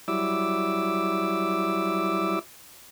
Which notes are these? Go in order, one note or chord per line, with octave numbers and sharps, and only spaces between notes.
F#3 G3 E4 D6 E6